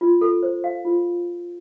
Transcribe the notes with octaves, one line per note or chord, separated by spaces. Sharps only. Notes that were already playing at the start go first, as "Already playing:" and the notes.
F4
A4
C5
F5
F4